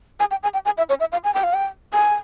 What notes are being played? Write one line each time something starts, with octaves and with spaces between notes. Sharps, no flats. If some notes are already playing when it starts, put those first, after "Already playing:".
G#5
G5
G#5
G5
G#5
E5
C#5
E5
F5
G#5
G5
F5
G5
G#5